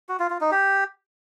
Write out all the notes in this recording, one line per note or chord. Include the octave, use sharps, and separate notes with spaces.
F#4
F4
F4
D#4
G4